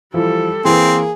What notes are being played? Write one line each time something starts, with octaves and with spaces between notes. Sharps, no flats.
E3 F3 G3 A4
E3 A#3 C4 G#4 B4